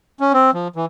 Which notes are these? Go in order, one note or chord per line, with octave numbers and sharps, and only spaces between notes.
C#4
C4
F3
E3